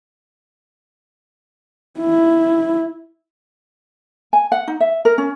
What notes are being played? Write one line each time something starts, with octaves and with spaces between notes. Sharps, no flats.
E4
G#5
F#5
D#4
E5
A#4
C#4